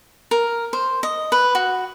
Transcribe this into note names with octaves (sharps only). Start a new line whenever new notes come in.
A#4
C5
D#5
B4
F#4